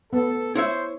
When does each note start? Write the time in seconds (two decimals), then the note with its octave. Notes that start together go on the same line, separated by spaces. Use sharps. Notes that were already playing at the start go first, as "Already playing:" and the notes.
0.13 A3 B3 A4
0.55 E4 C5 C#5 E5